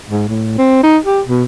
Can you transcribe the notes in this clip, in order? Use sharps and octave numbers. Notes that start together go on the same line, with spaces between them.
G#2
A2
C4
D#4
G4
B2